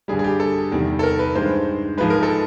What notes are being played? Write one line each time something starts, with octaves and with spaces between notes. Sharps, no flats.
G2 D3 G3 G#4
G#4
G4
A4
E2 C3 D#3 G3
A4
A#4
B4
G2 D#3 G#3 C5
G#2 F3 G#3 B4
A#4
A4